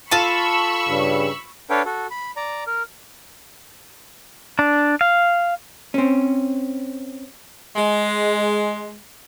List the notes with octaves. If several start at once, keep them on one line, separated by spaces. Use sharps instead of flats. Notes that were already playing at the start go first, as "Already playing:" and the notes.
F4 A4 F5 A5 B5 C#6 E6 D#7
G2 C#3
D4 A4 B4 C#5 F5 G5
F#4 A4
B5
D5 A#5
A#4
D4
F5
C4 C#4
G#3